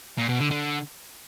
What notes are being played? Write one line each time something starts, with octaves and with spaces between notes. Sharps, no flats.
A#2
B2
D3
D3